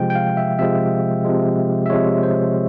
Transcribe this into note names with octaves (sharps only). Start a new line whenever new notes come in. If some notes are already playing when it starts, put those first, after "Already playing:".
Already playing: C3 F3 G#3 G5
G5
F5
E5
C3 F3 G#3 E5
C3 F3 G#3
E5
C3 F3 G#3 C#5
C5